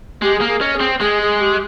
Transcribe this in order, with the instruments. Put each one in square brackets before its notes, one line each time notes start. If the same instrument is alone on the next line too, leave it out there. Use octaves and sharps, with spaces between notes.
[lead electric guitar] G#3 [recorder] G4
[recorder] G#4
[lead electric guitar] A#3
[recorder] G#4
[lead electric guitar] C#4 [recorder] D#5
[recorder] G#4
[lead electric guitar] C4
[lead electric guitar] G#3 [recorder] G#4
[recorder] G#4
G4